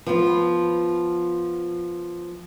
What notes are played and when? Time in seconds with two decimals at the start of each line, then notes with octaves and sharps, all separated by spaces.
0.06 F3 B3